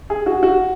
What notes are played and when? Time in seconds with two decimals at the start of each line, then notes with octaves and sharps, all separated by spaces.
0.10 G#4
0.26 F#4
0.43 F#4